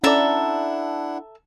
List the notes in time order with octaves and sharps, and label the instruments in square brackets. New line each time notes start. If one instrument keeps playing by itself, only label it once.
[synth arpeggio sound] C#4 D5 [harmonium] D4 E4 F#5 [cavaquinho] A4 E5 A#5